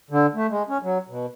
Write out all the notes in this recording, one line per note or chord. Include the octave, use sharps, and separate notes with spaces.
D3
A3
G#3
C#4
F#3
B2